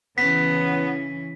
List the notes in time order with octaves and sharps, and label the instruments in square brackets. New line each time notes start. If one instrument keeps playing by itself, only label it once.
[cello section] C#3 E3 C#4 [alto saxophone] B3 [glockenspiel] B6